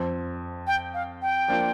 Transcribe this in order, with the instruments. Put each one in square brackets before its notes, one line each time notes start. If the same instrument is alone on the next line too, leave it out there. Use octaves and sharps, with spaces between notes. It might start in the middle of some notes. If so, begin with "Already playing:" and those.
Already playing: [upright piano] F2 F3 C4
[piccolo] G5
F5
G5
[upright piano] F3 A#3 D4 F4